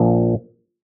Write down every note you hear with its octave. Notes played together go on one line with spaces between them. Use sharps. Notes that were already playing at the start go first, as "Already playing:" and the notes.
Already playing: A#1 A#2 F3